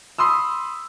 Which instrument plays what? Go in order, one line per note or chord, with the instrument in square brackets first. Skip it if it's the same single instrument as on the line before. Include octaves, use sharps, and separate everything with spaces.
[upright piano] B5 C6 D#6 E6